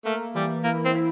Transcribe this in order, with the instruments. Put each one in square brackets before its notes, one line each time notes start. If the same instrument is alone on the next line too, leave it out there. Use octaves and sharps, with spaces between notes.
[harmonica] A3 [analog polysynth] A#3
[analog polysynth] E3 [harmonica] G3
[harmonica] A#3 [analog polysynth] E4
[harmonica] C4
[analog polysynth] E4